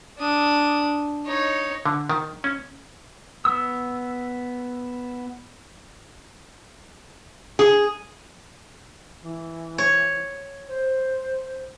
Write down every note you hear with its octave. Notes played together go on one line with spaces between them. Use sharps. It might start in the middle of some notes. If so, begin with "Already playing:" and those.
D4 D#6
D#4 C#5
D3
D#3
C#4
B3 E6
G#4
E3
C#5
C5